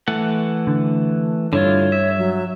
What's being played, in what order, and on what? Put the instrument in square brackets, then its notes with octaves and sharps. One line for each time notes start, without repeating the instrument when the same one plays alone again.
[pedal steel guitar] E3 A3 F#5
[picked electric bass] D3
[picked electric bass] G2 [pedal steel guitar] D3 E4 F4 [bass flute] C#5
[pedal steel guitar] E5
[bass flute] F#3